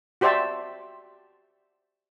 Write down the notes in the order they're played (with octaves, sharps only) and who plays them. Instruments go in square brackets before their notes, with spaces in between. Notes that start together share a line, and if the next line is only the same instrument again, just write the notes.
[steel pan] F#4 G4 C5 D5 E5 A5